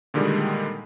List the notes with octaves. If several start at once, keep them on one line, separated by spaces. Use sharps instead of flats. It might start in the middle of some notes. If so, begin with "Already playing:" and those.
A#2 D3 D#3 G3 G#3